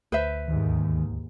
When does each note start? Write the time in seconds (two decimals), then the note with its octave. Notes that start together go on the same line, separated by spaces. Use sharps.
0.12 D2 B4 C5 E5
0.48 D#2 G#2 D#3